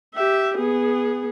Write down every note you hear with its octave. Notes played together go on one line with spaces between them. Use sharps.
G4 E5
B3 G#4